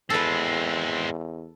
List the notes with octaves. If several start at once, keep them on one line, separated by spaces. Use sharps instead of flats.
E2 G#3 C4 A4 B4